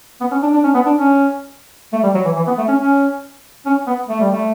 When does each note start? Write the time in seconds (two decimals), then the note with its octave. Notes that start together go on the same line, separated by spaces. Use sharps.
0.21 B3
0.31 C#4
0.42 D4
0.53 D4
0.64 C#4
0.74 B3
0.86 D4
0.96 C#4
1.93 A3
2.03 G3
2.14 F#3
2.25 E3
2.36 E3
2.47 B3
2.58 A3
2.68 C#4
2.79 C#4
3.66 C#4
3.87 B3
4.08 A3
4.20 G3
4.32 A3